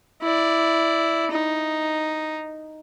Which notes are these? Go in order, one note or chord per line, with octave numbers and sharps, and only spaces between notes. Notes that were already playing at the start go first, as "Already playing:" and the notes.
E4 D5
D#4